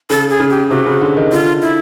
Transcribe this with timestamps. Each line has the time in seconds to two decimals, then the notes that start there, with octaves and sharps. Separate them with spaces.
0.10 C#3 A4
0.30 G#4
0.40 C#3
0.50 G4
0.70 C3 F#4
0.86 C#3
1.01 D3
1.17 D#3
1.32 D3 F4
1.62 E4